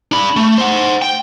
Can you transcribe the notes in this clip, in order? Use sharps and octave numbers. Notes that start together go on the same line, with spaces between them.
D4 B5
A3
C5 F#5
G5